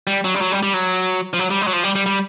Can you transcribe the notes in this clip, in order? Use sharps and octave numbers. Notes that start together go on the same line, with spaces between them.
G3
F#3
G3
F#3
G3
G3
F#3
F3
F#3
G3
G#3
F#3
F3
G3
G3
G3